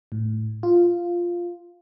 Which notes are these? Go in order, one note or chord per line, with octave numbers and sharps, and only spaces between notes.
A2
F4